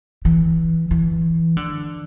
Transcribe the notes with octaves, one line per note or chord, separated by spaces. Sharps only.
E3
E3
D3